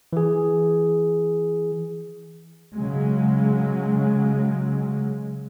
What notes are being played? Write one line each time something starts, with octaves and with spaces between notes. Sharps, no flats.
E3 G#4
C#3 F#3 G#3